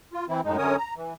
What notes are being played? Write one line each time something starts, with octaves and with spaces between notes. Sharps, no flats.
F4
E3 C4 E4
F#2 A2 G#3 D#4
F#2 D3 C#4 A#4 C#5 D#6
A#5
E3